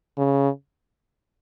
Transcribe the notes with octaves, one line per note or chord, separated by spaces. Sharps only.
C#3